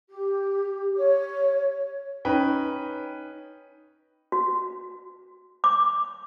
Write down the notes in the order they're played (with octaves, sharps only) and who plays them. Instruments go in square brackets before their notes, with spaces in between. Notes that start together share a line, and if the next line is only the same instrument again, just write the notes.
[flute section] G4
C#5
[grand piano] C#4 D#4 B4 G5
[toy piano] F#4
D6